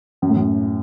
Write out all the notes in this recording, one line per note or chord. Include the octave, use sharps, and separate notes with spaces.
F#2
A2
F#2